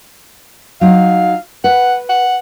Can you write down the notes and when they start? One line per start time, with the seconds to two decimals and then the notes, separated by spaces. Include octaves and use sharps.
0.81 F#3 D#4 F5
1.64 B4 F#5
2.09 F#5